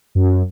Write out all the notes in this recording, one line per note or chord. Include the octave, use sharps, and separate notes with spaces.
F#2